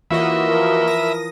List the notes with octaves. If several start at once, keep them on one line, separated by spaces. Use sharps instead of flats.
E3 A#3 F4 F#4 C#5 D#5 E5 B5
F3 A#4
D#6 A#6